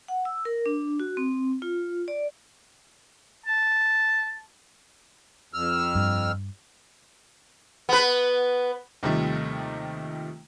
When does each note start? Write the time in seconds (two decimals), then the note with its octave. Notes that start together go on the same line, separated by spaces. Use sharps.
0.08 F#5
0.25 E6
0.45 A#4
0.66 D4
1.00 F#4
1.17 C4
1.62 F4
2.08 D5
3.46 A5
5.54 F2 E6 F6
5.95 G2
7.89 B3 B4
9.03 D#2 C3 D#3 F3 G3 A3